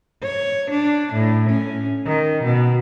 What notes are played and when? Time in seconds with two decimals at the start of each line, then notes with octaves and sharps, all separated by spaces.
0.23 C#5
0.71 D4
1.13 A2
1.50 C#4
2.06 D#3
2.44 B2